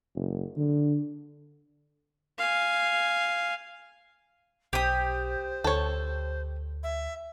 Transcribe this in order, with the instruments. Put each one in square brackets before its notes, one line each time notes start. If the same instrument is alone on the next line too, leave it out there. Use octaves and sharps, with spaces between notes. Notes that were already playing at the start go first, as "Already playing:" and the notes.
[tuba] F#1
D3
[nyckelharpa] F5 G#5
[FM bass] B1 [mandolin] G4 D#6 [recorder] C5
[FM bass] D2 [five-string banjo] A4 C#5
[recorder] E5